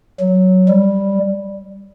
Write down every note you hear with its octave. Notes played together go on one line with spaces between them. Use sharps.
F#3
G3